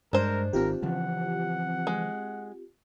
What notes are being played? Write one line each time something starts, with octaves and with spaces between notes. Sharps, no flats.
G2 G#3 D4 A#4 C5
G#1 D#3 C4 F4 G4 A#4
C#3 E3 F3 F#5
G#3